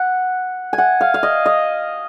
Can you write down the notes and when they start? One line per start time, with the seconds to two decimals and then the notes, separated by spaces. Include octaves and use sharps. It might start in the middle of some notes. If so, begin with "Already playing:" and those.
Already playing: F#5
0.73 G#5
0.78 F#5
1.01 F5
1.14 F5
1.23 D#5
1.46 D#5